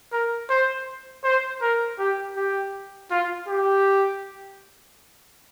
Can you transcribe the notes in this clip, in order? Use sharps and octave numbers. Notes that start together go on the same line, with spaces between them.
A#4
C5
C5
A#4
G4
G4
F4
G4